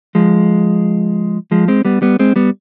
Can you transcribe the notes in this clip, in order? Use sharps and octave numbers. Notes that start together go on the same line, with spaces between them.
F3 G#3
F3 G#3
G#3 C4
G3 B3
G3 B3
G#3 C4
G3 B3